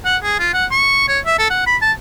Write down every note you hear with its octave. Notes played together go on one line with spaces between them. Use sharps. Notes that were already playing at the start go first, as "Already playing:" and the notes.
F#5
G#4
F4
F#5
C#6
C#5
E5
A4
F#5
B5
A5